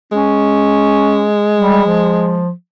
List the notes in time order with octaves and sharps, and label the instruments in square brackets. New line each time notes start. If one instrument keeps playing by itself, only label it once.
[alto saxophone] G#3 [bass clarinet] C#4
[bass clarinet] G3
F3